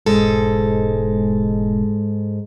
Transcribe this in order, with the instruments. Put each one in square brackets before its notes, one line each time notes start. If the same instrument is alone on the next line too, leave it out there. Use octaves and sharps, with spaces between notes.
[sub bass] E1 [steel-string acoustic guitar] G#2 G#3 A4